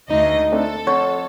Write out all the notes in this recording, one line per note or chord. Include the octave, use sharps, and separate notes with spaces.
D2 D#4 D#5
A3 C4 D4 A4
F2 C#5 F#5